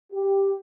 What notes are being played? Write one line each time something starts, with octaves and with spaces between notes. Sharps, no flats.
G4